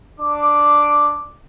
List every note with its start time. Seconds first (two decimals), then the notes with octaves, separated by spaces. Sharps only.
0.19 D4 D6